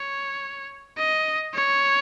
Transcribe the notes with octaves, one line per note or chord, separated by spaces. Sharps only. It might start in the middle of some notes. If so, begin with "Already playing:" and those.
Already playing: C#5
D#5
C#5